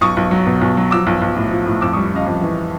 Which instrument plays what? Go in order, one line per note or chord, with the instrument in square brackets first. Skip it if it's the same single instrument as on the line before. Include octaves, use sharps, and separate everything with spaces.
[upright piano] B1 C#6 D#6
B1
F#3
B2
B1
F#3
F3 D6 E6
B1
B1
A2
F3
A2
F2 D6 E6
G3 C#6 D#6
C#3 D#5 F5
F2
E3